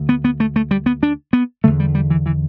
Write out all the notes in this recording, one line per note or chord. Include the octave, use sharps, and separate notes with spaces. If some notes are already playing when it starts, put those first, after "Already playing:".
Already playing: D2 D3
B3
B3
A3
A3
G3
B3
D4
B3
E2 D3 A3
G3
G3
E3
E3